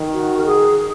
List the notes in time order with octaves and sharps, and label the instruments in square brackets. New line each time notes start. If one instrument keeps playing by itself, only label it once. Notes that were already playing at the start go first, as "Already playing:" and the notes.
Already playing: [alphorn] D#3
[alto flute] F#4
A#4
G#4